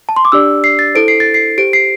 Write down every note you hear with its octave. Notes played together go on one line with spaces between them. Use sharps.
A5
C6
D6
D4 G4 D5 E6
C7
A6
E4 A4 C5 D7
C7
A6
C7
G4 C5 D7
C7